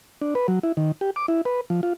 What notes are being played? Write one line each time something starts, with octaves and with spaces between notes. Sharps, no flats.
D4
B4
F#3
E4
D#3
G4
D6
E4
B4
F3
F4